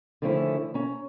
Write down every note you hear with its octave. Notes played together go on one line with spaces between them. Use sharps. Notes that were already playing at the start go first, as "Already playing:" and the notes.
D3 D#3 F3 A3 C#4 E4
C#4 A#5